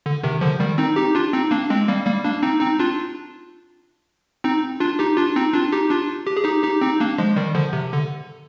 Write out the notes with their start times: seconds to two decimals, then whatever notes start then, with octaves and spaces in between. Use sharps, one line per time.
0.06 D3
0.23 C3 D#3
0.41 D3 F3
0.60 D#3 G3
0.78 C4 D#4
0.96 D#4 G4
1.15 D4 F4
1.33 C4 D#4
1.51 A#3 D4
1.70 G#3 C4
1.88 G3 A#3
2.06 G3 A#3
2.24 A#3 D4
2.43 C4 D#4
2.61 C4 D#4
2.79 D4 F4
4.44 C4 D#4
4.80 D4 F4
4.99 D#4 G4
5.17 D4 F4
5.36 C4 D#4
5.53 D4 F4
5.72 D#4 G4
5.90 D4 F4
6.27 G4
6.37 G#4
6.44 D#4 G4
6.63 D#4 G4
6.81 C4 D#4
7.00 A#3 D4
7.18 F3 G#3
7.36 D#3 G3
7.55 D3 F3
7.73 C3
7.92 D3